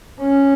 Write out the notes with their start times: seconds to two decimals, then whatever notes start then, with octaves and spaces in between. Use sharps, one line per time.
0.21 C#4